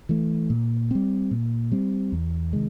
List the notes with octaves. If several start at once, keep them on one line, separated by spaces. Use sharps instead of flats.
E3 A3
A#2
G3 C4
A#2
G3 C4
E2
C3 D#3 G#3